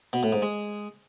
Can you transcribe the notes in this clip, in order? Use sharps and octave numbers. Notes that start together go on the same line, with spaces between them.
B2
A2
G#2
G#3